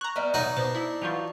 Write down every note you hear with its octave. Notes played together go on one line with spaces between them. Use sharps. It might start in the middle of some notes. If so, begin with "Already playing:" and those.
A#5 C#6 F#6
G3 B3 D#5 E5 F6
B2 F#3 D#4 D5 F#5 D#7
B2 D4 C5
E4
E3 F#3 F4 C#6 G6 F7